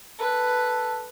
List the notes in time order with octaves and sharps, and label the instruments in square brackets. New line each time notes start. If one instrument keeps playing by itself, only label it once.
[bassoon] A4 [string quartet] B4